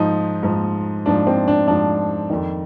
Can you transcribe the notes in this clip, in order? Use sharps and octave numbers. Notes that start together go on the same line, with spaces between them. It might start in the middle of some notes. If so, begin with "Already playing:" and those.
Already playing: G#2 F3 D#4
G#2 F3
G#2 F3 D4
C4
D4
G#2 F3 D4
F2 D#3